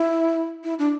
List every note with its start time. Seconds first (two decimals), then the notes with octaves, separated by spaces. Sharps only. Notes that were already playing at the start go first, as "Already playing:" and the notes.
Already playing: E4
0.64 E4
0.79 D4